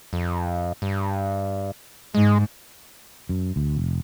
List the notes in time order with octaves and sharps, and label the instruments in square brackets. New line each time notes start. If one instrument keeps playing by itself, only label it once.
[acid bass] F2
G2
[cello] G#2 [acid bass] G#3
[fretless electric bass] F#2
D2
F1